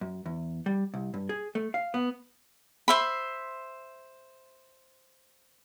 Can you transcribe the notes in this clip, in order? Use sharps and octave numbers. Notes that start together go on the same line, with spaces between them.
F#2
E2
G3
C2
G2
G#4
A3
F5
B3
C5 E5 B5